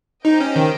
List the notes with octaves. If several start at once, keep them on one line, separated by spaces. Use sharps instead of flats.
D#4 G4 C5 D#5 G5
C#4
D#3